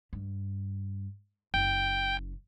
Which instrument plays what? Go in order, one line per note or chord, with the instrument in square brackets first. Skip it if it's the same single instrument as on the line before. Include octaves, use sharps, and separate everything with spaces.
[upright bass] G2
[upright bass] F#1 [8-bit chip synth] G5